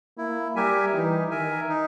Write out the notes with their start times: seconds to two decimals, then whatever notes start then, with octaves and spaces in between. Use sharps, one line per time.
0.17 A#3 E4
0.55 G3 G4 A#4 E5 G#5
0.93 E3 D#4
1.31 D#3 A#4 E5 G#5
1.69 D#4